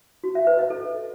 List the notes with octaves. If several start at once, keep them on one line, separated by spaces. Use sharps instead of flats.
F#4
E5
B4
D#5
A4